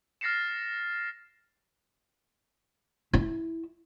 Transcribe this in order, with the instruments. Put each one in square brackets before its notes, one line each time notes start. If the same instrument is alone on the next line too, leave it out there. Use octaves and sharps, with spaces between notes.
[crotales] F6 A6 A#6 C7 C#7 E7
[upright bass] E4